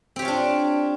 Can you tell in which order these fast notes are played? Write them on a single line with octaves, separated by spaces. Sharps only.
C4 G4 C#5 F4 D4